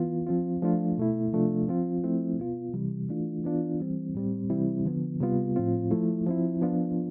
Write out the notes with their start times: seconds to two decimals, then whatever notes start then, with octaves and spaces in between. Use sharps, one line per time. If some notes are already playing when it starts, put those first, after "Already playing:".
Already playing: E3 B3 F4
0.27 F3 C4 F4
0.62 F3 A3 D4 F4
0.98 B2 A3 E4
1.33 C3 F3 A3 D4 F4
1.68 F3 C4 F4
2.03 F3 A3 C4 E4
2.38 B2 B3 F4
2.73 C3 E3 G3
3.09 E3 A3 D4 F4
3.44 E3 B3 D4 F4
3.80 E3 G3 C4
4.15 A2 G3 C4
4.50 C3 E3 G3 C4 E4
4.85 D3 F3 B3
5.21 C3 G3 B3 F4
5.56 A2 F3 C4 F4
5.91 F3 A3 E4
6.26 F3 C4 E4
6.61 F3 B3 D4 F4